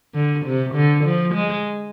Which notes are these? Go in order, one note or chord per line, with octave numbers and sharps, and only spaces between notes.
D3
C3
D3
F3
G#3